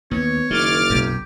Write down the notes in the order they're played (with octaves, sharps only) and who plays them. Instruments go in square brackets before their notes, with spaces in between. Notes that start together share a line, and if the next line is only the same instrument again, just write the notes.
[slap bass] D#2 [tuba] B3 [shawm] C#5
[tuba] F#1 [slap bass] D#3 [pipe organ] D6 F6 A6
[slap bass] B1 F#2 [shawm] G4